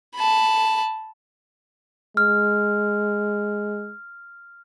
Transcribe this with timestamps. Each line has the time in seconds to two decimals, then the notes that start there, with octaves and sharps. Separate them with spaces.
0.15 A5 B5
2.17 G#3 F6